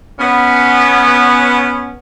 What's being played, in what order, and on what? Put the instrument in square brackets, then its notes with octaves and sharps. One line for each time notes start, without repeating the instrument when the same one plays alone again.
[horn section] B3 C#4